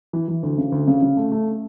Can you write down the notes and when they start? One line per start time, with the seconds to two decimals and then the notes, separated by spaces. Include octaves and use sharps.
0.13 E3
0.28 E3
0.43 D2
0.58 C#3
0.72 D2
0.87 C#3
1.02 C#3
1.17 A3
1.32 A3